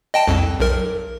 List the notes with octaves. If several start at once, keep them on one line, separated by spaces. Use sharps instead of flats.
D#5 G5 A5
C2 F2
B1 A#4